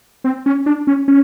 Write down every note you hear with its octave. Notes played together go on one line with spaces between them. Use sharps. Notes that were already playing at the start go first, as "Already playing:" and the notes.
C4
C#4
D4
C#4
C#4